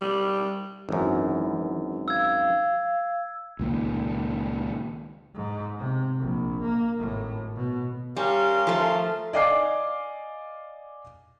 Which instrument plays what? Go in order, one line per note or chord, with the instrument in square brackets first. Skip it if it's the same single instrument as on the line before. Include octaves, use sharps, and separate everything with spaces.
[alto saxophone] G3
[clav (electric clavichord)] G#1 F#2 [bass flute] E3
[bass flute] F5 [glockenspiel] E6 G#6
[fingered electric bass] C#2 A#2 D#3
[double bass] G#2
C3
A#1
A#3
G#1 A2
B2
[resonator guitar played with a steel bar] G3 [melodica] C#4 [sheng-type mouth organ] A#4 F5 C6
[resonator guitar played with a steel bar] F3 A3
[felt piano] D5 D#5 F5 G#5 D6 C7